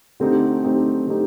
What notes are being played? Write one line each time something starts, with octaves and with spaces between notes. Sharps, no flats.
D3 A3 C4 D#4 G4
D3 A3 C4 D#4 G4
D3 A3 C4 D#4 G4